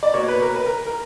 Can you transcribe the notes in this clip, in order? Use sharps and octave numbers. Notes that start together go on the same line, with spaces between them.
D5
B2 A#3 C#5
B4
A#4
B4
A#4
A#4